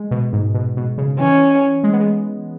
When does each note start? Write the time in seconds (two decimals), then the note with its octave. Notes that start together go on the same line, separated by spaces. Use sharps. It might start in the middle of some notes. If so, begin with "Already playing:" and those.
Already playing: G#3
0.11 B2
0.33 G#2
0.54 B2
0.77 B2
0.98 C#3
1.19 E3 C#4
1.84 G#3
1.93 B3
2.00 G#3